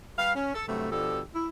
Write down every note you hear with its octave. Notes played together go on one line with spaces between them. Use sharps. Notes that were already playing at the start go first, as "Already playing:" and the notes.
G3 B4 F5
C#4
A4
G2 C3 F#3 A3
B2 F3 D4 G4 A4
E4